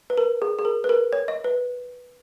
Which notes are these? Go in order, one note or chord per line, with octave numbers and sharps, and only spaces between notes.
B4
A#4
G#4
G#4
A#4
B4
A#4
C#5
D#5
B4